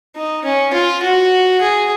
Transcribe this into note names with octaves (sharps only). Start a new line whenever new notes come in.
D#4
C#4
F4
F#4
G#4